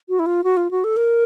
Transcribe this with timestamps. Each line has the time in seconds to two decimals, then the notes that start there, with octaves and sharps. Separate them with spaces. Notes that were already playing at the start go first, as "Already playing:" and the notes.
0.09 F#4
0.19 E4
0.26 F4
0.44 F#4
0.57 F4
0.71 F#4
0.84 A4
0.97 A#4